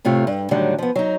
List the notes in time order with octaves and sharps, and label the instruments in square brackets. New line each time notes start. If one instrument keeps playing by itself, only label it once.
[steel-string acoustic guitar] A2 C3 A3 F4
G2
A2 D3 D#3 F#3 G3
F3 B3
F#3 D#4